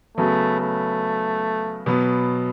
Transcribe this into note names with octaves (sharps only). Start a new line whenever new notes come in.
C#3 F#3 A3 B3
A3
B2 F#3 B3